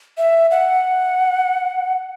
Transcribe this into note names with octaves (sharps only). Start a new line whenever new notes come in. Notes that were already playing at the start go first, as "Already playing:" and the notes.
E5
F#5